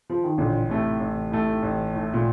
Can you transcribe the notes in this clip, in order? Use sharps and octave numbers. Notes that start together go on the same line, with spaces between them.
F3
D#3
A1 A#2 D3
A2 C3 A3
A1
A2 A3
A1
A2 A3
A#2